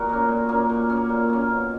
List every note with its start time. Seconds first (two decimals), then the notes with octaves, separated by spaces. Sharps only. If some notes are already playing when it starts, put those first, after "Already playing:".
Already playing: A#2 F#4 A#4
0.09 A#3 C#4
0.28 A#2
0.49 A#3 C#4
0.70 A#2
0.90 A#3 C#4
1.09 A#2
1.30 A#3 C#4
1.50 B2